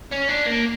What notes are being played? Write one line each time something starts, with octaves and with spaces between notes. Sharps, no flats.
C#4
D4
A#3